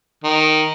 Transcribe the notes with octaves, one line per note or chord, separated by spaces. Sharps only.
D#3